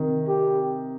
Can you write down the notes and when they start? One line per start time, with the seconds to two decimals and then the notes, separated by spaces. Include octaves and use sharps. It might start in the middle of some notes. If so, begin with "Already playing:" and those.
Already playing: C3 D#3
0.28 G4